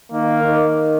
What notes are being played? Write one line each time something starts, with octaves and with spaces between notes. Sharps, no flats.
D#3 A#3
D#3